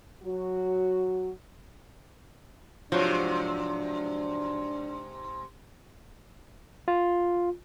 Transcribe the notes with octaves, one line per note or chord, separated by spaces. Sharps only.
F#3 F#4
G#2 C3 F3 F#3 D4
F4